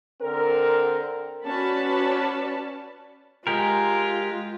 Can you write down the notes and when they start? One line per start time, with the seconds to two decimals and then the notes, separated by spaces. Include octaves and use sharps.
0.21 D3 C4 A#4
1.45 C#4 F#4 B4 D5 A5 B5
3.47 G#3 F4 G4 A#4